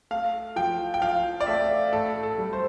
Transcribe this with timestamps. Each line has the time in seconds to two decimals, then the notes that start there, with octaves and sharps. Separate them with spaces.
0.11 A3 F5
0.56 F3 G5
0.94 G5
1.01 F3 F5
1.40 D5
1.46 A3 E5
1.92 A2 A4
2.23 A4
2.38 G3
2.53 C5